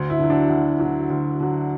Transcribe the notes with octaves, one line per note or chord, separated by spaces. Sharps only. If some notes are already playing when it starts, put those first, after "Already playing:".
Already playing: D2
E4
D3 F#3
D4
D2
D3 F#3
D2
D3 F#3